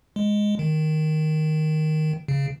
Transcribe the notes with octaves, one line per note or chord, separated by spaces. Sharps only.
G#3
D#3
C#3